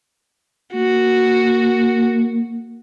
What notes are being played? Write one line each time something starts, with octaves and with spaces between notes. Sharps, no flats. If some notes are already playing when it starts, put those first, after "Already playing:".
A#3 F#4